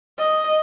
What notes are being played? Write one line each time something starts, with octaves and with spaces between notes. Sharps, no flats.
D#5